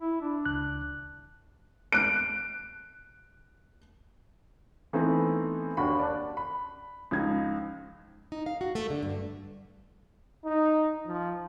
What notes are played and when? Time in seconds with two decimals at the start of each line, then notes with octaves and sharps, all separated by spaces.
0.01 E4
0.21 D4
0.46 C#2 F#6
1.92 F#6 D7
4.93 E3 A3 B3 C4 D#4
5.77 D#2 D4 F#4 B5 C#6
5.99 D5 A5 F#6
6.37 B5
7.11 C#2 F3 D#4 G#6
8.32 D#4
8.46 F5
8.61 F#4
8.75 A3
8.90 D3
9.03 G2
10.45 D#4
11.07 F3